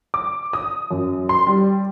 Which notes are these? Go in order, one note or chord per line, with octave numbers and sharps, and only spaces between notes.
D6
D#6
F#2
C6
G3